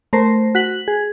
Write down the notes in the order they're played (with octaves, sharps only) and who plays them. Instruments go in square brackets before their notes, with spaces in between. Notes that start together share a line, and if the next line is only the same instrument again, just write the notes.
[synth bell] A3 A#4 C5
F#4 B6 F#7
G#4